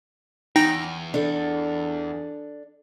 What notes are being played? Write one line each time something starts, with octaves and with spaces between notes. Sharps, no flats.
E2 D#4 G5 A#6
D4 A4